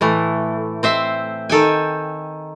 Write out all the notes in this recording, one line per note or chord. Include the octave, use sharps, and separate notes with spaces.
A2 E3 A3
C4 C5 E5
D#3 A4 G5 G#5